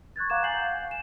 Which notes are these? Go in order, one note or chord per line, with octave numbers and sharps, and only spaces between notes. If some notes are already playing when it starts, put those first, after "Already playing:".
C#6 F#6 G#6 A6
F5 F#5 A#5 D6 G#6 E7
G#5 G6 A6 C7 F#7
F#5
G#5 E7